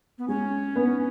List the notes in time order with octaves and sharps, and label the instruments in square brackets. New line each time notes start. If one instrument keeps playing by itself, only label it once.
[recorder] B3
[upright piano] G#3 [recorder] C#4
[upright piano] B3